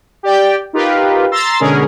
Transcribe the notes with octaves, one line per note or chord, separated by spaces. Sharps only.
G4 D5 G5
D#4 F4 G4 A#4 B4
A#5 C6 E6 A6 C7
B2 D3 G#3 C#4 G#4 A#4